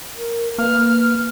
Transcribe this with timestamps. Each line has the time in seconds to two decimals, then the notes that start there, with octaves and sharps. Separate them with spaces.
0.17 A#4
0.58 A#3 B4 F6